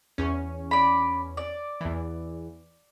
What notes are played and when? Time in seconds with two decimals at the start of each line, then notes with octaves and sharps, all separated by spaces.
0.18 E2 C#4
0.71 D5 B5
1.37 D5
1.81 E2 E3